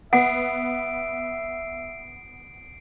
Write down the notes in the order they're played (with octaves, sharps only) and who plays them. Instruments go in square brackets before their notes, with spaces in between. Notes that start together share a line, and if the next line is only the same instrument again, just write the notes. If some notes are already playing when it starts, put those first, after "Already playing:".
[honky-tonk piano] B3 [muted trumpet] E5 [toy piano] F#5 [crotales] C7 D7